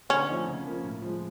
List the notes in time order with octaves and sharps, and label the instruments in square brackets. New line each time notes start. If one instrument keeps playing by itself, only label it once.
[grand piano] D3 [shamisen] C#4
[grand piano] F3 A3 C4 D#4
C#3
F3 A#3 C#4
A2
F3 G#3